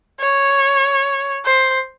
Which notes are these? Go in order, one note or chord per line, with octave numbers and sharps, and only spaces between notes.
C#5
C5